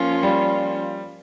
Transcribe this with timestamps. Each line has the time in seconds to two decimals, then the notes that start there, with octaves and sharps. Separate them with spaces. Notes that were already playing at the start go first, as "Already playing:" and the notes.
Already playing: F3 A#3 C#4 F4
0.23 G3